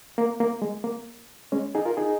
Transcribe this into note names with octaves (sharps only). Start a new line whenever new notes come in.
A#3
A#3
G#3
A#3
G#3 C#4
D#4 G#4
F4 A#4
D#4 G#4